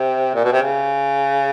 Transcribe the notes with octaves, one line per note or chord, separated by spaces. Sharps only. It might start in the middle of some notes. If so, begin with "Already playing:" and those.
Already playing: C3
A#2
B2
C3
C#3